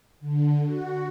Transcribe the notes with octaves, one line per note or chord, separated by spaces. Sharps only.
D3
F#4